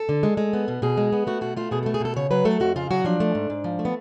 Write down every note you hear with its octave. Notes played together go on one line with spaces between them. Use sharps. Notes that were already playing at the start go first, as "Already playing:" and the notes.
Already playing: A4
D3
G#3
G#3
B3
B2
B2 G#4
G#3
B3
A3 F#4
B2 F#4
A3 F4
B2 G#4
A3 A4
G#4
B2 A4
C#3 C#5
F#3 B4
A3 A4
F2 F#4
C#3 F4
F#3 F#4
F3 D4
A3
G#2
G#2
F3
A3
B3